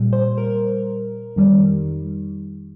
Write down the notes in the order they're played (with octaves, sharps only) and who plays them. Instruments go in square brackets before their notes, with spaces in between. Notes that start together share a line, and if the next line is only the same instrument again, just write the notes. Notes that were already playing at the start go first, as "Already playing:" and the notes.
Already playing: [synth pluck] A#2 G3
C5
A#4
F2 D#3 G3